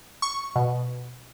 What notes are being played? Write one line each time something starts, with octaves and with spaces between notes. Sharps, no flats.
C#6
B2